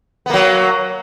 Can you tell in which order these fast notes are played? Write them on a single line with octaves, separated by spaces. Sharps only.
B3 A#3 F#3